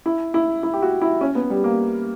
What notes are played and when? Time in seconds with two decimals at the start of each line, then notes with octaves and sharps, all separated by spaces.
0.06 E4
0.34 E4
0.63 E4
0.73 G4
0.82 F#4
1.01 E4
1.21 C#4
1.35 B3
1.50 G3
1.64 A#3